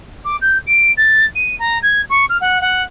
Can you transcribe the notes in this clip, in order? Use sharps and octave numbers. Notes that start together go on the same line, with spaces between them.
D6
G6
D7
A6
D#7
A#5
G#6
C#6
F6
F#5
F#5